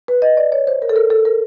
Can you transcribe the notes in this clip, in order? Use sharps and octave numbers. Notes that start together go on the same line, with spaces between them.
B4
D#5
D5
C#5
C5
A#4
A4
A#4
A4
A#4